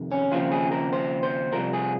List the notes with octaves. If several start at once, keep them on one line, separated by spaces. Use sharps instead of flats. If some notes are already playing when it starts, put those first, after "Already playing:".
Already playing: F2 C3 D#3
C#4
D#2 C#3 F3 C4 F4
G#4
A#4
C5
C5
C2 C3 F3 A#4
G#4